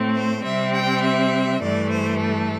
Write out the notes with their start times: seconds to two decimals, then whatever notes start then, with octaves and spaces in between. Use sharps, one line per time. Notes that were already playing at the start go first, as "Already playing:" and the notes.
Already playing: A2 A3 C4
0.15 C5
0.44 C3 G3 C4 E5
0.74 G5
1.03 E5
1.61 G2 E3 A3 D5
1.91 C5
2.20 A4